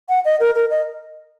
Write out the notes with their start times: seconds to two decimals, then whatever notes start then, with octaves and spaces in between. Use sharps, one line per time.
0.09 F#5
0.25 D#5
0.40 A#4
0.55 A#4
0.70 D#5